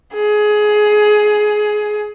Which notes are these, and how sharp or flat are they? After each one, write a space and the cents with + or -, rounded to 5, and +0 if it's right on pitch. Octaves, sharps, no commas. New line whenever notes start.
G#4 +20